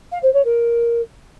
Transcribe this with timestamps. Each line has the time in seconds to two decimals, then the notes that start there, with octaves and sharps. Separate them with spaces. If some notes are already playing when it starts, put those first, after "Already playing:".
0.11 F5
0.22 C5
0.34 C#5
0.45 A#4